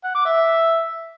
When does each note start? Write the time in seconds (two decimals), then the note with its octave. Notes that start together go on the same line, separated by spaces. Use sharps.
0.04 F#5
0.15 D6
0.25 E5